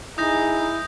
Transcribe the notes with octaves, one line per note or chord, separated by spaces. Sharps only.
D#4 E4 G#4 D#6 G6 A#6